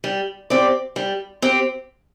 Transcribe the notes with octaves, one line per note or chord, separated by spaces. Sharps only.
G3
C4 G4 D5
G3
C4 G4